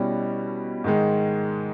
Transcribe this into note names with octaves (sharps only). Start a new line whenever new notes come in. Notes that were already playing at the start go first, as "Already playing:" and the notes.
Already playing: B2 G3 C#4 E4
G#2 D#3 G#3